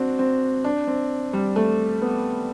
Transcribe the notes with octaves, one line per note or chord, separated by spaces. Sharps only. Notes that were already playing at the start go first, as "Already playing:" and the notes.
Already playing: C4 D4 F#4
C4
D4
C4
G3
A3
B3